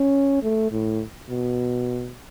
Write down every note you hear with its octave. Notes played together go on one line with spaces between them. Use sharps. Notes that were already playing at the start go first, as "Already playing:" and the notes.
Already playing: C#4
A3
A2
B2